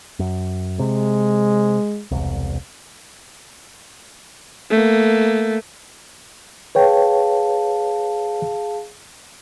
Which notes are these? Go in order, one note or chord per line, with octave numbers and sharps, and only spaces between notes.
F#2
C3 G#3
E1 C2
A3 A#3
G#4 B4 C#5 F5 G5 A5